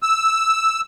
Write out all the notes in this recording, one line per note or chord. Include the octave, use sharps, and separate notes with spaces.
E6